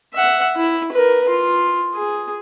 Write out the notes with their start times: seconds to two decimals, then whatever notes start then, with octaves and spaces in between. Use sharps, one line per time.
0.14 E5 F#5
0.56 E4
0.92 A#4 B4
1.28 F4
1.94 G#4